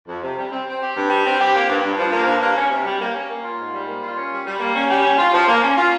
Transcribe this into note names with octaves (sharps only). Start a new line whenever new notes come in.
F2
C3
G3
C4
C4
G4
G2
G3
C4
G4
A#3
G2
G2
F3
A#3
G2
A#3
C#4
C3
G3
A#3
C#4
A#3
F4
G#2
G3
A#3
F4
C#4
G3
G3
A#3
C#4
G3
C#4
F4
F3
A#3
C#4
F4